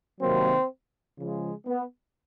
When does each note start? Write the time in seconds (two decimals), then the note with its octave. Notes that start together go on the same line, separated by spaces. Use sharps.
0.20 C3 D#3 F#3 A#3 C4
1.18 C#3 F3 G#3
1.67 B3